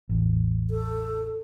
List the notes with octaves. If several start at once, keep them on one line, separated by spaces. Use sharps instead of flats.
A1 E2
A4